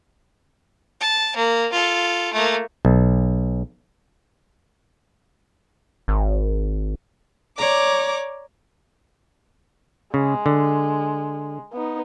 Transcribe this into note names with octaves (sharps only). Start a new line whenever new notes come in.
A5
A#3
F4 A4
A3 A#3
B1
G#1
C#5 D5 A#5 D6
C#3 G#3
D3
B3 D#4